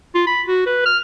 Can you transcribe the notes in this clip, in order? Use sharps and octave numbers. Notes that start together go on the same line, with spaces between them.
F4
B5
F#4
B4
F6